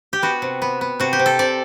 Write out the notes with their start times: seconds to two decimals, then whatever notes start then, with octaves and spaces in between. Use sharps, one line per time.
0.13 G4
0.22 B3 F#4
0.42 C3
0.62 B3
0.81 B3
1.00 C3 F#4
1.13 G4
1.19 C3
1.26 A4
1.39 C3 D5